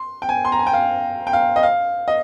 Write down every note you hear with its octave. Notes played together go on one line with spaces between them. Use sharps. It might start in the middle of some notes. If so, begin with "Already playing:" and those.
Already playing: C6
G5
G#5
C6
A#5
G#5
G5
F5
G5
F5
D#5
F5
D#5